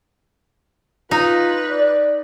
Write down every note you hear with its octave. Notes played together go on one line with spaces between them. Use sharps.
D#4 F4 B4
D5